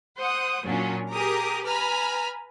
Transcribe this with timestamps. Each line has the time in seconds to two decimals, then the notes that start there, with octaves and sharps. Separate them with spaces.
0.19 C5 F#5 D#6
0.66 A#2 F#3 C#4 D4
1.12 G4 G#4 A#4 A#5 D6 D#6
1.65 B4 G#5 A#5 B5 F6